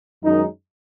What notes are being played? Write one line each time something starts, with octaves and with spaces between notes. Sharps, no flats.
F#2 D#3 G#3 D#4